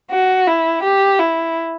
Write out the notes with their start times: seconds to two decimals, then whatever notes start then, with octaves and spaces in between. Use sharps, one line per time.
0.11 F#4
0.47 E4
0.83 G4
1.19 E4